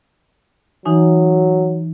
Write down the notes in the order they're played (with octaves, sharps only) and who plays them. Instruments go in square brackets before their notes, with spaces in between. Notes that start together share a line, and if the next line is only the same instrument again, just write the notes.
[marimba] E3 D#4 G#5 [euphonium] F#3